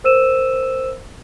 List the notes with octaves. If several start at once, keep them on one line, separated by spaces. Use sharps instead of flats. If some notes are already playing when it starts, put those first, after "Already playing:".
A#4 C5 E6 D#7 E7